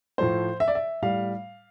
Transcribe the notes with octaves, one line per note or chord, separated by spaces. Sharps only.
A2 F3 A3 C5
E5
D5
E5
A2 G3 F5